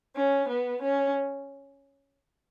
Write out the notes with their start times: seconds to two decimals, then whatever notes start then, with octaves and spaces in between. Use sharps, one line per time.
0.16 C#4
0.49 B3
0.81 C#4